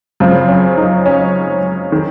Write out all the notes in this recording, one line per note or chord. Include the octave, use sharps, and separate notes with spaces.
F#2 C#3 F3 C4
C#4
D#4
C#4
D#3